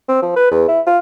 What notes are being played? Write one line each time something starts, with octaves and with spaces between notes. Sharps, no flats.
C4
F3
B4
E2
E4
F4